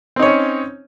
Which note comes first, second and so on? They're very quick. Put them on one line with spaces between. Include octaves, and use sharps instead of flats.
C4 D#4 C#5 C#4